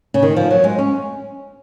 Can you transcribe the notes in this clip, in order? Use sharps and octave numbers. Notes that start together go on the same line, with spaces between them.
C#3
D#3
F3
F#3
G#3
C#4